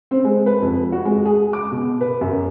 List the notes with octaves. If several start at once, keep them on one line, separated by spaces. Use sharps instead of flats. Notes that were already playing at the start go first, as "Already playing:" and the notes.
C4
G#3
B4
F2
F#4
G#3
G#4
D6
B2
B4
F#2